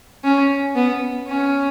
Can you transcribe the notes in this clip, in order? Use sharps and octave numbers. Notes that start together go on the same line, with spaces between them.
C#4
B3
C#4